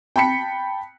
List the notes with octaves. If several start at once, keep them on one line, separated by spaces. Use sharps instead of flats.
G5 A5 B5 B6 C#7